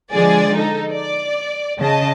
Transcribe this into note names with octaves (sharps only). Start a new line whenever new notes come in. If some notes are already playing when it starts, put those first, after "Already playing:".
D3 F3 G#3 G#4 D5
D#4 A4
D5
C#3 D#5 A5